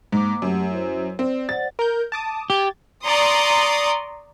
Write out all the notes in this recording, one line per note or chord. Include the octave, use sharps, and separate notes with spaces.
G#2 A#3 A#5 D6
F#2 A3 G4 F#5
E4 F#4 C5
C4 D5
C5 D5 F#5 A6
A#4 G6
A5 D6 D#6
G4 D6 G#6 A6
D5 A#5 C6 C#6 D#6